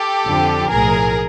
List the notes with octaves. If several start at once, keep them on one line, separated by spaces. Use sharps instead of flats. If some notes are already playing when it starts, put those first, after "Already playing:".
Already playing: G4 A4
F2 D3 F3
B1 A2 F3 G#4 A#4